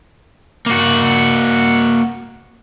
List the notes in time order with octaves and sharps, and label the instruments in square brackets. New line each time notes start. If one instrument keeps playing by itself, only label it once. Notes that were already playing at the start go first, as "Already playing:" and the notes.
[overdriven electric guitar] A#3 F#4